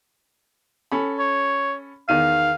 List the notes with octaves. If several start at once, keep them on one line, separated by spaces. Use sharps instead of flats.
C#4 A4 B5
C#5
E2 D#3 F5 D#7